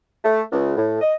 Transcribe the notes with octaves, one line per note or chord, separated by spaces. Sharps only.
A3
C#2
A2
D#5